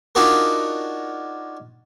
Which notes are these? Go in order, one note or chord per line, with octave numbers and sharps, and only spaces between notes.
D4 D#4 F4 F#4 G#4 A#4